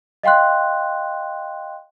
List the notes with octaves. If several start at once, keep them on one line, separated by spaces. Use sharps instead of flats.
D#5 F5 G5 C6 F#6